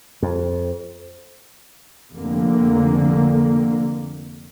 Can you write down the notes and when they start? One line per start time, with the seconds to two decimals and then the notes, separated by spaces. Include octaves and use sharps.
0.22 F2
2.14 F1 F2 D3 A#3